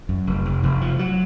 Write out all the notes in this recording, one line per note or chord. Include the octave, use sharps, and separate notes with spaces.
F#2
F1
F1
F1
F3
F#3